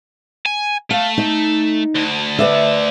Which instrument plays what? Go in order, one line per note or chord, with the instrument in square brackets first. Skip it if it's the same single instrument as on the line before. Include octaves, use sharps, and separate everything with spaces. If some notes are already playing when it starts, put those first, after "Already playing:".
[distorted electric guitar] G#5
[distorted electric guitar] A3 [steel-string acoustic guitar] F5
[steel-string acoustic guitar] D#4
[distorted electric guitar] D2 D3
[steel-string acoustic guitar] B4 D5 E5